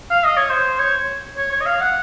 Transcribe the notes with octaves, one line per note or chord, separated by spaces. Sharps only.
F5
D#5
C#5
C5
C#5
C#5
C#5
D#5
F5
F#5